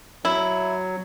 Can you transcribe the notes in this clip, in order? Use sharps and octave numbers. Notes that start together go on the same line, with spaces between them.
F#3 E4